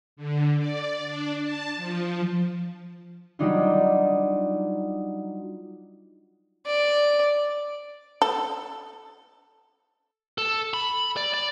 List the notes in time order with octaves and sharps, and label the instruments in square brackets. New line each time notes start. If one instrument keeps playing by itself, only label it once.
[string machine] D3
D5
D4
A5
F3
[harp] F#3 G3 D4 D#4 F4
[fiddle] D5
[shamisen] A4
[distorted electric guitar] A4
B5
D5
D5